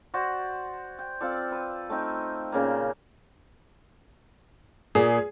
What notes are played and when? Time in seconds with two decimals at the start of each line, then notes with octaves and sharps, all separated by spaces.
0.14 F#4 C5 D5
0.99 G5
1.21 C4 F4 A4 D5
1.52 B4
1.90 A3 C4 D#4 G5
2.52 A#2 C#3 A#3
4.95 A#2 G#4